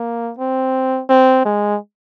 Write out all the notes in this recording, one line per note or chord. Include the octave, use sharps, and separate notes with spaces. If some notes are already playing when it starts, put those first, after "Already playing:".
Already playing: A#3
C4
C4
G#3